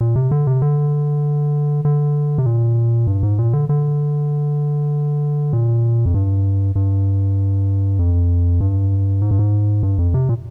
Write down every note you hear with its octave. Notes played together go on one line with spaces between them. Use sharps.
A#2
C3
D3
C3
D3
D3
C3
A#2
G2
G#2
A#2
D3
D3
A#2
F2
G2
G2
F2
G2
G#2
G2
G#2
G2
F2
C3
A#2